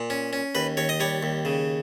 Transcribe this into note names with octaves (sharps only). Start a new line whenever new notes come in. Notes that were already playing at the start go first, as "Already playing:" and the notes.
Already playing: A#2
C#4
C#4
D#2 B4
D#2 C#5
D#5
G3 C#5
D#2
C#3